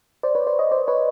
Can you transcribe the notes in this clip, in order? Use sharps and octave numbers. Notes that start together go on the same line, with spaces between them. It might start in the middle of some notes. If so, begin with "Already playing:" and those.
C5 D5
B4 C#5
C5 D5
C#5 D#5
C5 D5
B4 C#5